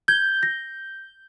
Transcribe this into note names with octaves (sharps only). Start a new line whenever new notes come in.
G6 G#6
A#6